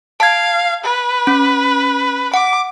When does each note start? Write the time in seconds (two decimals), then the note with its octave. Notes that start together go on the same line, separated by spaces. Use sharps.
0.20 F5 A5 G#6
0.84 B4
1.27 C#4
2.34 F#5 D6